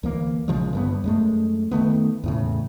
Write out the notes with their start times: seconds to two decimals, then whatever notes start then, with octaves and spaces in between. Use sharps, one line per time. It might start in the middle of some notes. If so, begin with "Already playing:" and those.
0.03 D2 E3 A#3
0.48 A#1 C#3 F3 G#3
0.73 G1 G2 B3
1.04 F#2 G#3 A3
1.71 D#3 E3 A3 B3
2.24 E2 A2 C#3